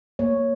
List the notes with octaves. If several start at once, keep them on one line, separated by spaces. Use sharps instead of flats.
A#3 C#5